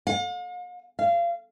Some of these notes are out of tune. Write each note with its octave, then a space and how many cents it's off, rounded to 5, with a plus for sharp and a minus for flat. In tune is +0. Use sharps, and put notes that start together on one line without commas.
F5 +45
F5 -25